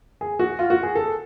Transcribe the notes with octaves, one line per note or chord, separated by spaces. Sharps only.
G#4
F#4
F4
F#4
G#4
A4